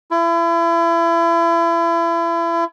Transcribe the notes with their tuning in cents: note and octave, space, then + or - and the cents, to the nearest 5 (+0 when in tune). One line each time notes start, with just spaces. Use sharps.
E4 +35